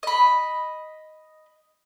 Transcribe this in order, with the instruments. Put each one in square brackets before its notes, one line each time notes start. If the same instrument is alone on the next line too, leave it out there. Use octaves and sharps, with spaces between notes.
[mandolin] D#5 B5